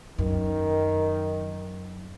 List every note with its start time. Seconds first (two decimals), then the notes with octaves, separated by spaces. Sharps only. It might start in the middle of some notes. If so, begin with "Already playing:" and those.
0.19 F#2 D#3